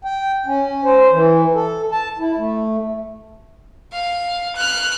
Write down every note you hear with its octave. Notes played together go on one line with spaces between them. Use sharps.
G5
C#4
C5
E3
A4
A5
E4
A3
F5
F6 F#6